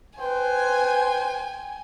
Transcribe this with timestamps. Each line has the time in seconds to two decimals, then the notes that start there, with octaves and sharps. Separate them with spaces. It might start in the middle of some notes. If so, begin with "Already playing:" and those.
0.19 B4 C5 G5 G#5